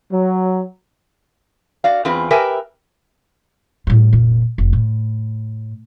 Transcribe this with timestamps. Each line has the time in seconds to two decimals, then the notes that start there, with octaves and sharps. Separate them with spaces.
0.13 F#3
1.84 F#4 D5 F5
2.05 E2 C4 F4 G#4 B4
2.31 G4 A#4 B4 E5 G5 G#5
3.87 A2 G3
4.13 F1 A#2
4.58 F1
4.73 A2